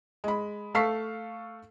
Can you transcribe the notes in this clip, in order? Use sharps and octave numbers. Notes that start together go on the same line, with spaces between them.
G#3 B5
A3 A4 F5 C#6 B6 C7